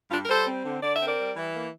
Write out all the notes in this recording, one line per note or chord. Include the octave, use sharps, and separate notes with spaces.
G2 D4 F4
A#4
G3 A4 C5
C4
D3
D3 D5
E5
C4
A#4 D5
G3
E3
A#3